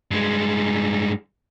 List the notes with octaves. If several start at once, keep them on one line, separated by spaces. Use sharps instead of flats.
G2 G#3